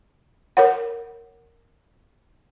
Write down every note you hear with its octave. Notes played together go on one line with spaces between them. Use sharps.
A#4 C#5 F#5